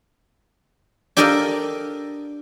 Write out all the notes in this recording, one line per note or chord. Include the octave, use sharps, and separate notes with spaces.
D4 G4 A4 A#4 D5 D#5